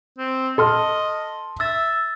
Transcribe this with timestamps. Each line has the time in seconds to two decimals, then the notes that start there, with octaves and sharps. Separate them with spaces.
0.18 C4
0.58 A4 D#5 C6 F6
1.60 E5 E6 A6